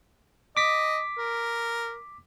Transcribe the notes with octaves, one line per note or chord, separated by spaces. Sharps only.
D#5 D6 B6
A#4